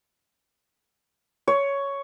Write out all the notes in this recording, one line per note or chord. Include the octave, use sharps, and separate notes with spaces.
C#5